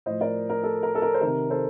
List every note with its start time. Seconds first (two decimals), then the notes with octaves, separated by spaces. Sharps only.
0.06 A2 F3 C5 D#5
0.21 A#4 D5
0.49 A#4
0.63 A4
0.83 A#4
0.95 A4
1.02 A#4
1.14 C5
1.21 C3 D#3 A#4
1.50 A4 C5